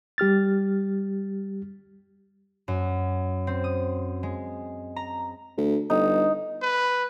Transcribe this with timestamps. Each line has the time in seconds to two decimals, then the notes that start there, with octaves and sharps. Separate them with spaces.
0.18 G3 G4 F6 A6
2.68 F#2
3.47 C4
3.64 D#6
4.23 G#3
4.96 A#5
5.57 D2
5.90 G1 D#4
6.62 B4